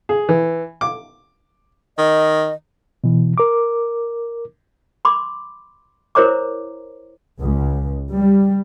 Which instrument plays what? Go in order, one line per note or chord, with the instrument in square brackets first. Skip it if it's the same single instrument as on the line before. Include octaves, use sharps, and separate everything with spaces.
[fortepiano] G#4
E3
D6
[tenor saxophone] D#3 [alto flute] D#5
[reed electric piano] B2 E3
A#4 D6
[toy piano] B5 C6 D6
E4 A#4 C5 C#5 A#5 D6
[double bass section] C#2
G3